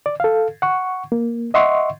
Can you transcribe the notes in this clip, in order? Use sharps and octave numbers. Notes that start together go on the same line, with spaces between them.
D5
A4 F5
F#5 C#6
A#3
D#5 E5 F#5 C6 C#6